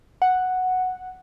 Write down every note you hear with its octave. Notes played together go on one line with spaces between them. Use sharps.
F#5